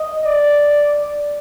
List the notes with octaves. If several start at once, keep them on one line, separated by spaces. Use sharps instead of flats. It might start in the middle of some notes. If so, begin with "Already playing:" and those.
Already playing: D#5
D5